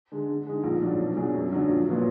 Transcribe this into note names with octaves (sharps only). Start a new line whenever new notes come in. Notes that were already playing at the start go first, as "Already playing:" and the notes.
D3 G#3
D3
G#3 D#4
A#1
G#2 F#3 D4
B2
F#3 D4 G#4
F#2
D3 F#3 D4
A#1
A#2 F#3 B3 F4